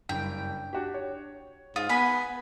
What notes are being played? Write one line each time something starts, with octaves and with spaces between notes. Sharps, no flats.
F#1 G2 G5
D4 F#4 G4
C#5
G#2 F4 D#6
B3 B4 G#5 B5